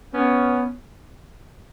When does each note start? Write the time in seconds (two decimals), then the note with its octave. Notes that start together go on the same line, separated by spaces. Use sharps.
0.14 B3 C#4